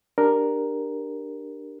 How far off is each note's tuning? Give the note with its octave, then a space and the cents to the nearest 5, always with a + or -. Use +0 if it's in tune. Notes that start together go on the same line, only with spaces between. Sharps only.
D4 +20 G4 +0 A#4 +0